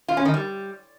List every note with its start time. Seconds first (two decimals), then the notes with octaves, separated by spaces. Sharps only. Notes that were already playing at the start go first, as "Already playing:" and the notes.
0.08 F4
0.17 C#4
0.25 D#3
0.34 G3